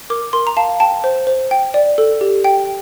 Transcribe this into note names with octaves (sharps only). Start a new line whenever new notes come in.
A#4 D6
A#4 C6
A#5
F5 A5
G5 A5
C5
C5
G5
D5
A4
G4
G5